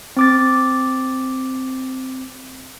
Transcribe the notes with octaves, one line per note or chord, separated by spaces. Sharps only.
C4 D6 A6